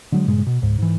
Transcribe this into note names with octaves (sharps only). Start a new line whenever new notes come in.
D3 F#3 G#3
G2 A#2 C#3 G#3
B2
C#2 G#2
G#2 E3